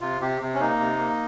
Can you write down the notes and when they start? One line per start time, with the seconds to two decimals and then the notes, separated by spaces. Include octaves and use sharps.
0.01 C3 F4
0.21 C3 G4
0.41 C3
0.55 C#4
0.60 A#3 D#4
0.80 C3
0.99 A#3